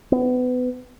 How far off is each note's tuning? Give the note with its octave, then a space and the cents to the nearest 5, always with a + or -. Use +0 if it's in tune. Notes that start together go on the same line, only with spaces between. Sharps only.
B3 +25